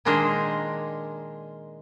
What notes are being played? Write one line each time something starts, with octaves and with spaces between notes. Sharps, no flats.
A#2 D#3 G#3 D4 A#4 C5